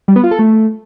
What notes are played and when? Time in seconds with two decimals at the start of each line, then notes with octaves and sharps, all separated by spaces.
0.08 G3
0.16 B3
0.24 F4
0.31 A4
0.39 A3